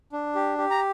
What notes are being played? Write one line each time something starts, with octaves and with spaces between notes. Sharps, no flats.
D4
G4
G4
A#5